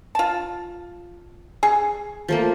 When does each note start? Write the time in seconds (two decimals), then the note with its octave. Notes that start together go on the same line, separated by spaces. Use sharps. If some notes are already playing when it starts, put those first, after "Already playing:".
0.15 F4 A5
1.63 G#4 C#6
2.28 F3 A3 A#3